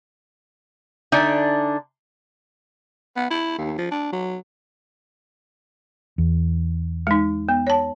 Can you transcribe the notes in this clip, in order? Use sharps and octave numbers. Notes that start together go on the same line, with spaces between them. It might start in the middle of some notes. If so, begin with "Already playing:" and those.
D3 D4 D#4 E5 G#5
B3
E4
D#2
F3
D4
F#3
E2
G#3 D#4
B3
C#5 A5